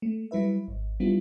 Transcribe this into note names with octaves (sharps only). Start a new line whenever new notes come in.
A3
F#3 G3 E4 B4 E5
G#1
F#3 G3 B3 D4 E4 F4